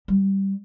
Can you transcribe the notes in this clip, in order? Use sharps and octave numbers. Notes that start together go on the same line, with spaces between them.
G3